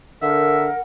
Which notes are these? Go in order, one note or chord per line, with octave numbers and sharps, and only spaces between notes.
D3 A#4 E5 F#5